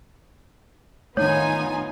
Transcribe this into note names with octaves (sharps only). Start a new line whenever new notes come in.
D#3 A3 B3 D#4 F4 C#5 G#5